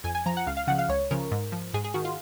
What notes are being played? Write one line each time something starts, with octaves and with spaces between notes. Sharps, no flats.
F2 G#5
G#5
F3 A#5
F#5
C#2 F5
F5
C#3 F3 F#5
F5
C#2 C#5
C#3 F3 A#4
G#2
F3
G#2 G#4
G#4
D#3 F#4
F4